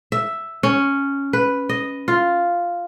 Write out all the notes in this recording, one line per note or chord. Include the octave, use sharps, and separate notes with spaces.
E5
C#4
B4
D#5
F4